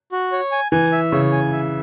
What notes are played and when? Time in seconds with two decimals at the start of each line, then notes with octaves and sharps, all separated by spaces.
0.12 F#4
0.32 C#5
0.52 G#5
0.72 E3 G#5
0.92 E5
1.12 C#3 C#5
1.32 G#5
1.52 E5